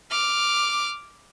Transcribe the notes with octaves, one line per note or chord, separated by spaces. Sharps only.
D6 F6